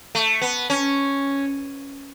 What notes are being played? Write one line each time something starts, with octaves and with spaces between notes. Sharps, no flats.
A3
B3
C#4